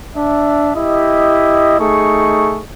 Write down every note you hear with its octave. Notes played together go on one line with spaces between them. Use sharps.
D4 E5
E4 G4 D#5
A3 D#4 G#4 C#6